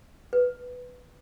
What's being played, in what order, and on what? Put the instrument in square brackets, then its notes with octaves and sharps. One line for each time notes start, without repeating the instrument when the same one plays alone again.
[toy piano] B4